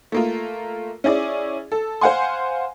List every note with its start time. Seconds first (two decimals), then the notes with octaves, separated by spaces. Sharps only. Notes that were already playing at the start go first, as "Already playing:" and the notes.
0.12 A3 A#3 F4
1.04 C#4 E4 G#4 D5
1.72 A4
2.01 C5 F5 F#5 G#5 C6